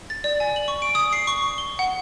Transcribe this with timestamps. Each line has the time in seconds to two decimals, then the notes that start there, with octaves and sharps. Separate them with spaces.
0.10 A6
0.24 D5
0.40 G#5
0.56 F#7
0.68 C#6
0.82 D7
0.95 D#6
1.13 C7
1.27 C#6
1.58 G7
1.79 F#5